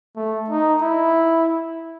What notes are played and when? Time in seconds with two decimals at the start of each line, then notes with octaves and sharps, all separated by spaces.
0.16 A3
0.50 D#4
0.82 E4